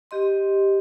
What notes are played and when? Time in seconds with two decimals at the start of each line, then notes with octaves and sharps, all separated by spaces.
0.11 G4 D#5 C6